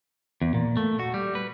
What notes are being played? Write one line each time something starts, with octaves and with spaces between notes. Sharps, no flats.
E2
A#2
A3
F#4
G3
B4